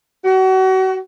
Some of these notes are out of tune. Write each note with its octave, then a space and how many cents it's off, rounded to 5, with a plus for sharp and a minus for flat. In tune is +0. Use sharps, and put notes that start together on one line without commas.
F#4 +35